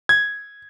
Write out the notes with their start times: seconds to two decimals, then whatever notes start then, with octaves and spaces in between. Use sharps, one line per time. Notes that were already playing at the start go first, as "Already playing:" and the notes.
0.09 G#6